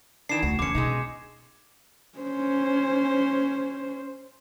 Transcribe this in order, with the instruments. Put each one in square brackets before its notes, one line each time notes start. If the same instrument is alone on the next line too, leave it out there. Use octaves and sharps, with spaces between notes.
[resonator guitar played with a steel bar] D#3 E3 D4 [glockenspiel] C7 E7
[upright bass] D2 [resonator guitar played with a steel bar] F#4
[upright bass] E2 [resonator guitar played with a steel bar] D3 C#4 [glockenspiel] D6 C#7
[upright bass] B2 [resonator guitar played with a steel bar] G#3 C#4 D#4
[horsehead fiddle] C#4 C5